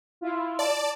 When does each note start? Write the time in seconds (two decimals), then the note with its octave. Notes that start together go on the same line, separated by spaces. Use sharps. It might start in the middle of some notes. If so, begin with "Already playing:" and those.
0.21 E4 F4
0.59 D5 A5